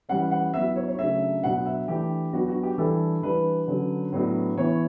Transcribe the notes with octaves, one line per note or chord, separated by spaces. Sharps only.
E3 G3 C#4 F#5
F#5
F#3 B3 E4 E5
C#5
C#5
C#3 F#3 A3 D4 E5
B2 F#3 B3 D4 F#5
E5
E3 A3 D4 G4
F#3 B3 D4 F#4
F#4
G4
E3 G3 D4 A4
E3 G3 D4 B4
D3 F#3 C#4
A2 F#3 B3 D4
E3 B3 E4 C#5